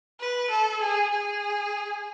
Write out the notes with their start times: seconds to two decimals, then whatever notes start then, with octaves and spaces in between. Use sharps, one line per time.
0.20 B4
0.50 A4
0.81 G#4
1.11 G#4